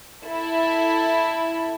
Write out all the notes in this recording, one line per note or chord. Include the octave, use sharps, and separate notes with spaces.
E4 A4